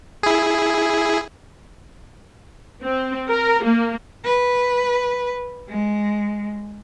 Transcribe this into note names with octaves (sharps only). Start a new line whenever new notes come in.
E4 G#4
C4
A#4
A#3
B4
G#3